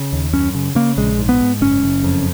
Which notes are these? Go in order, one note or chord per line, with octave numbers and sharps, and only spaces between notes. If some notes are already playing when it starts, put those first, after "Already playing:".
Already playing: C#3
D#2
F#2 C#4
C#3
C#3 A#3
A#1 G#3
G#2
B3
G#2
F#1 C#4
F#1
F2